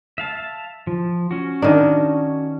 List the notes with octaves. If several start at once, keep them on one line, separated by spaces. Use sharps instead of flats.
E5 F5 A5
F3
C#4 F#4
D#3 D4